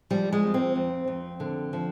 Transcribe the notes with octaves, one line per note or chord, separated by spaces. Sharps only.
F3 G3
G#3
F2
C4
F2
F2
D3
F3